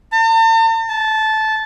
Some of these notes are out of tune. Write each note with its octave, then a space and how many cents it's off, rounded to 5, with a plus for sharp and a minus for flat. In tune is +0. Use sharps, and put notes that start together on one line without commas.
A5 +45
A5 -15